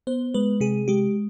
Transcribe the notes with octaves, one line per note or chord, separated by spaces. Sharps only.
B3 C5
G#3 B4
C3 G#4
G#3 G4